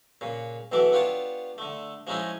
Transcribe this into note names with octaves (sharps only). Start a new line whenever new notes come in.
A#2 C#3
B1 B2 E3 F#3 E5 D6
B3 D4 F4 G4 C#5 A5
D3 A3
F3 G#3 C#4 D#4 E4 G#4